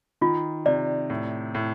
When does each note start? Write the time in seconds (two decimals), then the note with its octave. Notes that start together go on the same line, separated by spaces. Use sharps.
0.21 D#3 F4
0.66 C3 D5
1.10 A2
1.55 A2